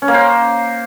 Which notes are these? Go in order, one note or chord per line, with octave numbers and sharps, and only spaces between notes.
C#4
A#3
C5